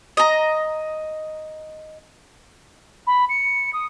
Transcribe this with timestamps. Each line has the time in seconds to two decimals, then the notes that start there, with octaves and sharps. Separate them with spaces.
0.17 D#5 A#5
3.07 B5
3.29 C#7
3.73 D#6